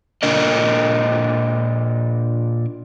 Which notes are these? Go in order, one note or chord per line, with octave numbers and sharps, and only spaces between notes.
A#2 D4 A#4 D#5